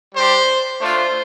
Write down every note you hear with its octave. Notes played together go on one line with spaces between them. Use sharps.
G3 D4 G4 C5
A3 D4 F4 C5